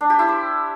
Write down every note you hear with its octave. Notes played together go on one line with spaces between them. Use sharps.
D4
G4
E4
C5